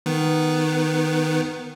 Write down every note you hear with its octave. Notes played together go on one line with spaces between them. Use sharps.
D#3 B3